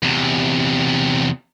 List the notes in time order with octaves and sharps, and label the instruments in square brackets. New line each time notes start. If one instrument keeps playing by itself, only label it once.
[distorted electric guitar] E2 C3